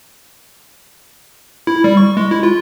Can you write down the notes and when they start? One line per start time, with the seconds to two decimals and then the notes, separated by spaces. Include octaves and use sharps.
1.67 E4
1.84 G3
1.97 C#6
2.17 G#3
2.31 E4
2.43 F4